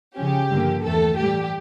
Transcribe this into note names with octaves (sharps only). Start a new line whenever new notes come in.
C#3 F3 C#4 G4
G2 D3 F3 A#3
E2 E3 A3 A4
A2 E3 G3 G4